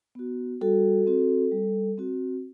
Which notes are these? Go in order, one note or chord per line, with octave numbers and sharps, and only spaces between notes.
B3 F#4
G3 F#4 A4
C4 F#4
G3
C4 F#4